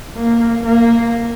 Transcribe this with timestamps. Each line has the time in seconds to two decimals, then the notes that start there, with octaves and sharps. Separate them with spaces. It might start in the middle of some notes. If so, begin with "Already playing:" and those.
0.17 A#3
0.65 A#3